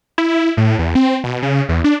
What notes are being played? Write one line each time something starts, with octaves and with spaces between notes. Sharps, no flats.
E4
A2
E2
C4
B2
C#3
E2
D4